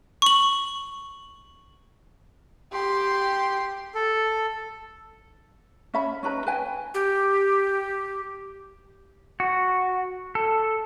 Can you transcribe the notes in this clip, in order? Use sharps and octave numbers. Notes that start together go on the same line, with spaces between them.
C#6 F#7
G4 C6
A4
C#4 E5 B5
C#4 D#4 B4 A#5
B4 G5 G#5
G4
F#4
A4